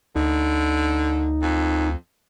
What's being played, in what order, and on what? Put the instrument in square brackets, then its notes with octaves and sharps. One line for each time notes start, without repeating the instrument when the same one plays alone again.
[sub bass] D2 [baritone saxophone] D3 [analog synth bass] D#4
[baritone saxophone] F2